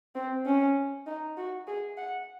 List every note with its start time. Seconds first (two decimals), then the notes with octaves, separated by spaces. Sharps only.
0.15 C4
0.46 C#4
1.07 D#4
1.37 F#4
1.68 G#4
1.98 F#5